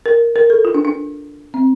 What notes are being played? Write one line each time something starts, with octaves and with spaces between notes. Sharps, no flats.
A#4
A#4
A4
F4
D4
D4
C4